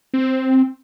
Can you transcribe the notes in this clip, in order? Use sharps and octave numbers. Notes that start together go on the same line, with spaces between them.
C4